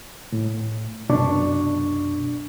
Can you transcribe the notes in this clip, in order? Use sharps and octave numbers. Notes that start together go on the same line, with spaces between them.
A2
C2 F#2 B2 D4 D5 C#6